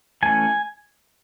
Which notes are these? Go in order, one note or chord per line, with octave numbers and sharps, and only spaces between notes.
E3 A3 C#4 G#5